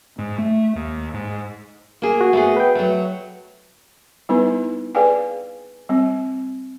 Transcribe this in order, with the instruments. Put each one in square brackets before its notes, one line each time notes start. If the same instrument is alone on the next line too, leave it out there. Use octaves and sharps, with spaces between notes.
[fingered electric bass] G#2
A3
D#2
G#2
[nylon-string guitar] A#3 G#4
[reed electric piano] F#4
[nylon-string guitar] A3 B3 G#4
[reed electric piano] B4 G5
[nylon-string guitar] F#3 A3
[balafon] G3 B3 D#4 E4 B4
G#4 B4 D5 F5 G5 G#5
G3 C4